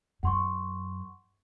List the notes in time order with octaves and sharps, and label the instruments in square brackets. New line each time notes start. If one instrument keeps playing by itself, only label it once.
[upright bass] F#2 [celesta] F#5 C6 C#6